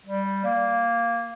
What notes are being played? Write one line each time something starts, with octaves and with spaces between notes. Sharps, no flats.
G3
A#3